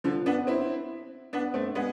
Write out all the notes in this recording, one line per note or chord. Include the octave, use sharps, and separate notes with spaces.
D3 F3
B3 D4
C4 E4
B3 D4
A3 C4
G#3 B3